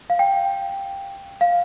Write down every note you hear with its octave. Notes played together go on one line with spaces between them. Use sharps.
F5
G5
F5